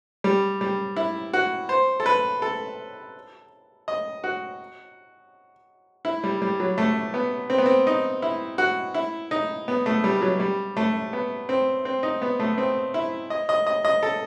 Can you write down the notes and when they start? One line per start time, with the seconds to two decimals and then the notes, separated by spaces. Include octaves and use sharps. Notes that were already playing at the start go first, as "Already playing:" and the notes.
0.24 G3
0.61 G3
0.97 E4
1.33 F#4
1.69 C5
2.00 A4
2.06 B4
2.42 A4
3.88 D#5
4.24 F#4
6.05 E4
6.24 G3
6.42 G3
6.60 F#3
6.78 A3
7.14 B3
7.50 C4
7.58 B3
7.66 C4
7.87 D#4
8.22 E4
8.58 F#4
8.94 E4
9.31 D#4
9.68 B3
9.86 A3
10.04 G3
10.22 F#3
10.40 G3
10.77 A3
11.13 B3
11.49 C4
11.85 C4
12.03 D#4
12.22 B3
12.40 A3
12.58 C4
12.94 E4
13.30 D#5
13.49 D#5
13.67 D#5
13.85 D#5
14.03 A4